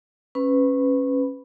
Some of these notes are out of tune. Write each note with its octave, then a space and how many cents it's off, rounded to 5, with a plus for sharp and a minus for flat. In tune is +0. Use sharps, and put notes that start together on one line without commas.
C#4 -15 B4 +15 B5 +0